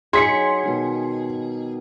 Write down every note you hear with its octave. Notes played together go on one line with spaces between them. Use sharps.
F#3 D#4 G#4 D#5 C6 B6 C#7
B2 D#3 G3